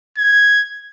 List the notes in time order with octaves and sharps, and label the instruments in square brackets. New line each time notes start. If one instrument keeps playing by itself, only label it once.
[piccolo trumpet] G#6